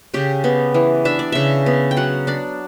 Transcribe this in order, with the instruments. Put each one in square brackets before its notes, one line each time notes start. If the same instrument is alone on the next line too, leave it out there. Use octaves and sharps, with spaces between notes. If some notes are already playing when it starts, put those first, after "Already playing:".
[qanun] C#3 G4
B3
E3
D4 E5
D5
C#3 E5
B3
G5
F#3 F#5
D4 D5